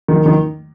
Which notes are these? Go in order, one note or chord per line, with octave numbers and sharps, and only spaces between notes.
D#3
D#3